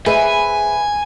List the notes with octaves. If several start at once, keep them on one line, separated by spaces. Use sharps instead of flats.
G#4 B4 C5 E5 G#5